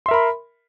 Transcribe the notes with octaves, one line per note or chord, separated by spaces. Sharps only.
A#4 E5 B5 C6